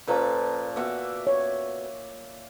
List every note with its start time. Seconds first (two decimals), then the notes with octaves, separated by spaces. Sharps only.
0.07 A#2 F3 C#4 A4 B4 A#5
0.76 B3 F#4 E5 D6
1.27 C#5